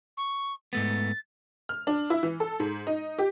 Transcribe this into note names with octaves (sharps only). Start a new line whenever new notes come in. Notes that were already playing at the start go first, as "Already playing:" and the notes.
C#6
G#2 A3 B3 A6
F6
D4
E4
E3
A4
G#2
D#4
G4